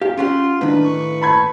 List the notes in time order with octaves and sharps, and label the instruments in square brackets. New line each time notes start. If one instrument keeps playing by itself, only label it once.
[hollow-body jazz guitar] G4 [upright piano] F5
[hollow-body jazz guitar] C#4 G4 F#5 [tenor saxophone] F4 [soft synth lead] C6
[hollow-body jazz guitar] A2 D#3 [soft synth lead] D4 [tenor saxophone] B4
[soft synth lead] C#6
[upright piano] A5 B5 G#6